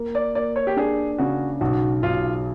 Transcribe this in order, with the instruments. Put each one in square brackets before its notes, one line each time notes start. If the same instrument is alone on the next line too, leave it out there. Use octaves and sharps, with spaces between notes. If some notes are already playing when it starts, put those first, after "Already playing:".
Already playing: [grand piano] A#3
[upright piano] D5
[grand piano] A#3 [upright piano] D5
[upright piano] C#5
G4
[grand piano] D4 [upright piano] G#4
[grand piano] C#3 [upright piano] F#4
[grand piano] B1 [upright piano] F#4
[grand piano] B1 [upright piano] F4